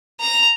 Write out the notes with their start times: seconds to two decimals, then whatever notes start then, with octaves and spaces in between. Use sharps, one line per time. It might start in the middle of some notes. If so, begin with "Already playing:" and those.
0.20 A#5